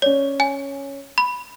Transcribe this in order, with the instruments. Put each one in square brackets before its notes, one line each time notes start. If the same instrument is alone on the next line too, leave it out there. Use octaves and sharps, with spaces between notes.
[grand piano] C#4 D5 [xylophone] C#5
[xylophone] G#5
B5